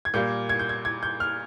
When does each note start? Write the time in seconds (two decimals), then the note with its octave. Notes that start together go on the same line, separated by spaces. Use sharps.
0.05 G#6
0.14 A#2 G3 A#3 G6
0.49 G#6
0.59 G6
0.69 G#6
0.85 G#6
1.03 G6
1.20 F6